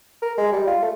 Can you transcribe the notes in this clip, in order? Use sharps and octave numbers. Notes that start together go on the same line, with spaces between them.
A#4
G#3
G3
F4
A3